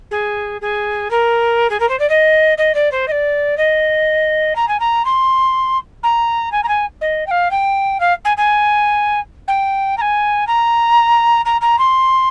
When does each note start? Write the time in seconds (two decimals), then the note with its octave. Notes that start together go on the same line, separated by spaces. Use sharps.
0.11 G#4
0.61 G#4
1.10 A#4
1.70 G#4
1.80 A#4
1.88 C5
1.99 D5
2.09 D#5
2.58 D#5
2.74 D5
2.91 C5
3.08 D#5
3.11 D5
3.57 D#5
4.55 A#5
4.68 G#5
4.79 A#5
5.05 C6
6.03 A#5
6.51 G#5
6.63 A#5
6.68 G#5
7.01 D#5
7.26 G5
7.31 F5
7.51 G5
8.00 F5
8.24 G#5
8.37 G#5
9.47 G5
9.97 A#5
10.01 G#5
10.47 A#5
11.45 A#5
11.61 A#5
11.78 C6